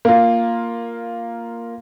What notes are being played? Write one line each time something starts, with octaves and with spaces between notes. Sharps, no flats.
A#3 F4